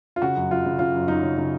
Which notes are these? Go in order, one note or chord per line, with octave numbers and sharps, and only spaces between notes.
F4
C#3 F#4
F#2
F#2 F4
C#3
C#3 F4
F#2
F#2 D#4
C#3
C#3